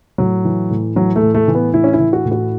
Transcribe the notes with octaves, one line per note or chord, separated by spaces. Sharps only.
A2 F#3
E3
A2
E3 F#3
A3
A2
A3
E3
B3
A2 E4
C#4
E4
E3
F#4
A2
F#4